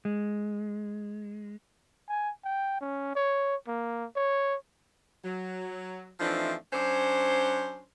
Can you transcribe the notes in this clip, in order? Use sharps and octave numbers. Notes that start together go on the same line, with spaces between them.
G#3
G#5
G5
C#4
C#5
A#3
C#5
F#3
E3 F3 A3 C4 D4 D#4
F#3 C#4 D4 C5